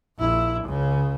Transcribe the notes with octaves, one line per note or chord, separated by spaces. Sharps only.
A#1 E4
C#2 C#3